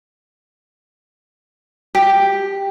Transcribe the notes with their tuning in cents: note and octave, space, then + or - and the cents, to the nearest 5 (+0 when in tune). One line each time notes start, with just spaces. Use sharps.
G4 +5